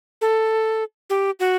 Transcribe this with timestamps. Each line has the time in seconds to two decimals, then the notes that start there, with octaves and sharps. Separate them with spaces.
0.21 A4
1.10 G4
1.40 F#4